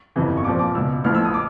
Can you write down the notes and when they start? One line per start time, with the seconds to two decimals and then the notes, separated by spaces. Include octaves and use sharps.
0.16 G1 F2 C3 E3
0.37 C#6
0.44 A#1 A#2 F3 D6
0.59 D6
0.75 C#2 E6
0.79 B2
1.04 A1 A2 F3 F6
1.15 E6
1.25 D#6
1.34 D6